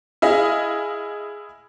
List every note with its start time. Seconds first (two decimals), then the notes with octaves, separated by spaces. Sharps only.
0.22 E4 G#4 D#5 F5